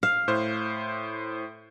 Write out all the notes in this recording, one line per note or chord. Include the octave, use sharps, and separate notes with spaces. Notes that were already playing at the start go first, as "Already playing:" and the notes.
F5
A2 C5